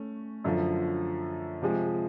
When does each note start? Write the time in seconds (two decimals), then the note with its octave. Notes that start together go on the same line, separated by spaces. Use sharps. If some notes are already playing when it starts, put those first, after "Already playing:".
Already playing: A3 C#4
0.44 F#2 D3 F3
1.62 C3 F3 G#3